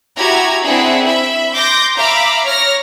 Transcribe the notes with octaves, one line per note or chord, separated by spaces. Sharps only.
E4 F#4 G4 G#5 A#5 G#6
C4 D4 E4 G#4 F#5
E5 B5
C6 D6 G6 A#6
E5 F5 A#5 B5 D6
C#5 F6 A#6